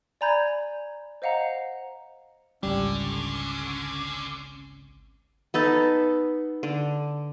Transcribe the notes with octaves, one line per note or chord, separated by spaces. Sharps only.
D5 G#5 A#5 B5 G6 G#6
C5 D#5 F5 F#5 A#5
G#1 C#2 D3 G3 C#4
B3 D#4 A4
D3